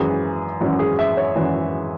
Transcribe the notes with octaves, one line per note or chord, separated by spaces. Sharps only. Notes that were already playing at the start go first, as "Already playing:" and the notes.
Already playing: G#1 F#2 E3 G#4
G#1 F#2 E3
G#4
E5
C#5
G#1 F#2 E3